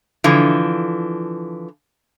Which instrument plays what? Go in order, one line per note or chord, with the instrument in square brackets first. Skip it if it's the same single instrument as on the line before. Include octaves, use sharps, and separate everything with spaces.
[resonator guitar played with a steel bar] D3 E3 F3